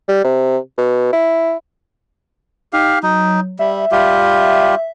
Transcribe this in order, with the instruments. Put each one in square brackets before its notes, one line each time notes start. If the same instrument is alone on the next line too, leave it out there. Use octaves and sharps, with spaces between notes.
[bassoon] G3
C3
B2
E4
[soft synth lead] D#4 [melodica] G4 F5
[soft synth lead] F#3 [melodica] D#4
[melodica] G3 [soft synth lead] E5
[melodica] G3 F4 G4